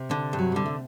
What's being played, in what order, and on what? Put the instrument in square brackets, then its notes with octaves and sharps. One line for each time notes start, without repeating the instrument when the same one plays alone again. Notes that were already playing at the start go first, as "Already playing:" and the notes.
Already playing: [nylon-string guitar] C3
[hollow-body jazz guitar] D3
G2
[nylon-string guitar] F#3
[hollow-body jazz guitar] D3 [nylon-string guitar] G3
[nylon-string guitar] A3